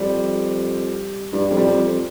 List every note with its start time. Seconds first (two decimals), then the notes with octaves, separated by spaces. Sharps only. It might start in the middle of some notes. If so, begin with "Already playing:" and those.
Already playing: F2 G3
1.32 G2 G3
1.51 F2
1.56 G3
1.67 F2
1.85 F2